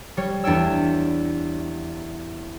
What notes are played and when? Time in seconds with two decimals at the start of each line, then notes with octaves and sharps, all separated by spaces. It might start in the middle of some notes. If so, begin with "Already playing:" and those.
0.17 G3 C#5
0.44 E2 D4 C#5 G5 E6